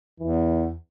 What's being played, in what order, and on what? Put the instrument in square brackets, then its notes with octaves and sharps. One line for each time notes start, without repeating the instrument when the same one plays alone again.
[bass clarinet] E2 [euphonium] E3